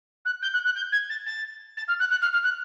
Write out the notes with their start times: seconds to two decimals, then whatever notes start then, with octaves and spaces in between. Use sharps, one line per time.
0.25 F#6
0.42 G6
0.53 F#6
0.64 F#6
0.75 G6
0.92 G#6
1.09 A6
1.26 A6
1.77 A6
1.88 F6
1.99 F#6
2.10 F#6
2.21 F6
2.32 F6
2.44 F#6